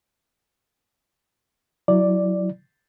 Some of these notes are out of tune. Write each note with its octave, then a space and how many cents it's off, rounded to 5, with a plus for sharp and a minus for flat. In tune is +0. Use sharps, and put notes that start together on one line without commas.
F#3 +0 E4 +0 D5 +0